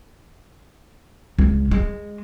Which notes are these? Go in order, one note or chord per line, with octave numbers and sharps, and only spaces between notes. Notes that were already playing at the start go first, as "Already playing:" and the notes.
C#2
G#3